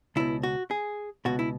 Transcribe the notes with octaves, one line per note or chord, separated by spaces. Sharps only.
C#2 B2 E4
F#4
G#4
C#2 B2 F#4
E4